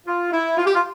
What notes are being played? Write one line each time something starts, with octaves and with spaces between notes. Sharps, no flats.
F4
E4
F4
G4
F4